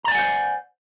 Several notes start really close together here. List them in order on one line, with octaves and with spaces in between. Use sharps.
A#5 D5 G#5 F#5 C5